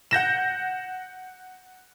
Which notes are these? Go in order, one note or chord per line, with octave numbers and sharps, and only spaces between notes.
F#5 G6 A#6 E7